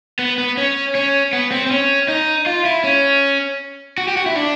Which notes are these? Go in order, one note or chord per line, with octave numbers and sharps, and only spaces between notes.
B3
B3
C#4
C#4
B3
C4
C4
C#4
D#4
F4
E4
C#4
F#4
G4
F#4
E4
D4